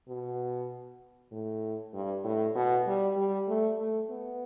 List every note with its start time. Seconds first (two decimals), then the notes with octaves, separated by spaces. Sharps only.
0.08 B2
1.32 A2
1.94 G2
2.24 A2
2.55 B2
2.86 G3
3.17 G3
3.48 A3
3.79 A3
4.09 B3